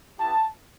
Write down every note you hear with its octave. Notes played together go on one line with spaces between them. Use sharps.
B3 E4 G4 A5